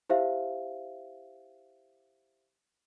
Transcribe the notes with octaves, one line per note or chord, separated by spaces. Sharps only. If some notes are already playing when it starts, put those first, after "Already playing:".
E4 G4 C5 E5 F5